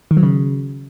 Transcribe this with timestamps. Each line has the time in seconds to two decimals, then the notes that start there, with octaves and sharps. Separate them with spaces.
0.11 D#3
0.17 F#3
0.23 C#3